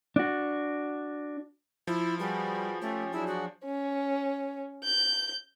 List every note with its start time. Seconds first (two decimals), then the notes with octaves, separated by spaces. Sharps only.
0.16 D4 F#4
1.87 F3 E4
2.19 G3 F#4 G#4 B4
2.82 A3 C#4 G4 C#5
3.12 F#3 D4 E4 G#4
3.27 F#4
3.65 C#4
4.84 G6